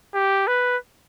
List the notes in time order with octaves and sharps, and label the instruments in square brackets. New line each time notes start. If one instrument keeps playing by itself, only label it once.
[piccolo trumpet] G4
B4